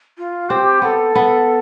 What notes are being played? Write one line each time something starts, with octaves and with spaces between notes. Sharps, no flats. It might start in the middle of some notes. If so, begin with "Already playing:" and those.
F4
C4 G4
B3 A4
B3